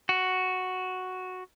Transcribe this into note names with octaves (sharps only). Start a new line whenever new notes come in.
F#4